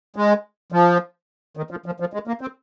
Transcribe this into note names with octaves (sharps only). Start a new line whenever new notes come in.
G#3
F3
D#3
F3
F3
F3
G#3
A#3
C4